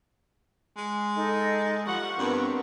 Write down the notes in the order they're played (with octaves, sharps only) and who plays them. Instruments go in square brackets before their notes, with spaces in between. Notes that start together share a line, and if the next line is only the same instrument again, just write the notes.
[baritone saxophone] G#3
[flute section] D#4 A4 D#5
[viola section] F3 G3 F#5 [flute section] C#6
[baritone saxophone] G2 [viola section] B3 C4 A#4